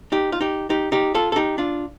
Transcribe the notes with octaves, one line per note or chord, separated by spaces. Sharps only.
D#4 G4
F4
D#4 G4
D#4 G4
D#4 G4
F4 A4
A4
D#4 G4
D4 F4